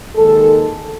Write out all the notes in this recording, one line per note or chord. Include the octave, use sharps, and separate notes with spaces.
D#2 D#3 G#3 A4